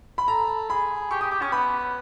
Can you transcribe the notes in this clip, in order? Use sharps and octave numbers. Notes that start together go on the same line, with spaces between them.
B5
A4 A#5
G#4 B5
G4 C#6
G4 D#6
G4 D6
C#4 C#6
B3 B5